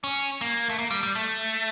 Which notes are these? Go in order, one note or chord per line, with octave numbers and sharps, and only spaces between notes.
C#4
A#3
A3
A#3
G3
G3
A3